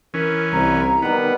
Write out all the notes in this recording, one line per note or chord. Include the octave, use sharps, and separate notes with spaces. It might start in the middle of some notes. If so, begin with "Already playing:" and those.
E3 C#4 A#4
C2 A#5
B2 D#3 G3 B3